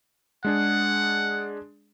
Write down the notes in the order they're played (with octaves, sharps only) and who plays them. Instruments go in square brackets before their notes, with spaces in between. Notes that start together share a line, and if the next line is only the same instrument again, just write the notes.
[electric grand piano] G#3 D4 G#4 [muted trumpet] F#5